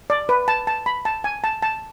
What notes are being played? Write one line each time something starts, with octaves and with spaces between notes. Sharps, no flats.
D5
B4
A5
A5
B5
A5
G#5
A5
A5